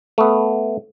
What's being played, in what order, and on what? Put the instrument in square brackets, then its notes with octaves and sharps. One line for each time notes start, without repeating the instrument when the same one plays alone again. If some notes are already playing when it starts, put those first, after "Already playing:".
[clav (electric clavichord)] A3 B3